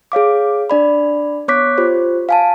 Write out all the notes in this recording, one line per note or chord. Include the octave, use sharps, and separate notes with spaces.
G#4 C#5 F5 D6
D4 D5 B5
B3 C#5 C#6 D6 F#6 B6
F4 G4 C5
F5 G#5 A5